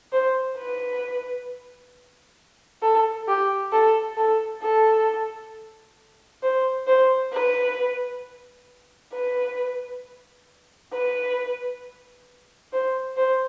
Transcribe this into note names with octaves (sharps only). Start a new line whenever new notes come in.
C5
B4
A4
G4
A4
A4
A4
C5
C5
B4
B4
B4
C5
C5